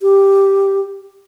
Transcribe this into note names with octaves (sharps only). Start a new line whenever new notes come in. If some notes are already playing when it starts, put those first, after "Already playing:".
G4